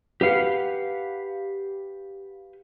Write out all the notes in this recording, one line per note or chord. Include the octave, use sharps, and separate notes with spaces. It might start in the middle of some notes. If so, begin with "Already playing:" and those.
G4 B4 F5 F#5